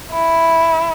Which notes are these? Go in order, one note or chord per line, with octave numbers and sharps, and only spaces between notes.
E4